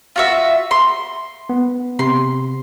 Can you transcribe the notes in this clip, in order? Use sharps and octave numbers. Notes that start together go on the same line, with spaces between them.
F4 F#4 E5
C6
B3
C3 C6